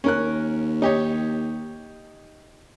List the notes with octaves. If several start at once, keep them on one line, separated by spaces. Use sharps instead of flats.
D#2 C#4 A#4 F#6
D#4 G4 C#5